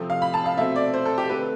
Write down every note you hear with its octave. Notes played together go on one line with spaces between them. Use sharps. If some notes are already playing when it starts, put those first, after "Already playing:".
Already playing: C3 F3 A3 C4
F5
B5
A5
F5
B2 A3 C4 E5
D5
C5
A4
G4
D3 A3 C4 B4